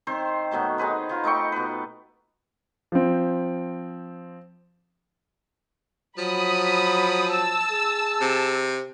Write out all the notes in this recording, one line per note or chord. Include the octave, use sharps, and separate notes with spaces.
D#3 C4 C5
B2 D#3 F#3 A3
D#4 G#4 B4 C5
D#3 F4
A3 D#4 G5 C#6
B2 B4
F3 C4
F3 F#3 B5 D#6
A5 E6
G#4
C3